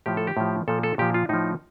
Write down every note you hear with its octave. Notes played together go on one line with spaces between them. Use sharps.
A2 F3 G4
A4
G4
A2 F3
A#2 F3 A4
A4
A#2 F3 G4
F4
A2 F3 D#4